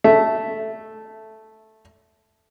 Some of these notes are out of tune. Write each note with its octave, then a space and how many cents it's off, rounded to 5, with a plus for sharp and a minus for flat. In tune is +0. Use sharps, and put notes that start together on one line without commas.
A3 -5 E5 +0